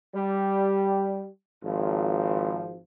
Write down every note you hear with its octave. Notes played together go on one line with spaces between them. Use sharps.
G3
G#1 F3